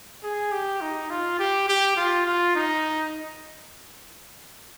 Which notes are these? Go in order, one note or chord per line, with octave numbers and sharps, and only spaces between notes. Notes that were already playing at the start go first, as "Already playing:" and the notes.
G#4
G4
D#4
F4
G4
G4
F4
F4
D#4